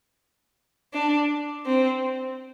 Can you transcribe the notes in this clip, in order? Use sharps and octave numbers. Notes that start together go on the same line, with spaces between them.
D4
C4